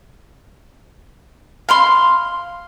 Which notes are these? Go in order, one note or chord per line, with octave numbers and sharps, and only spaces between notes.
F5 B5 C6